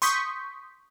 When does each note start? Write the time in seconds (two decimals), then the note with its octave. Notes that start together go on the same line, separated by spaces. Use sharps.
0.02 C6 C#6 D#6 G6 B6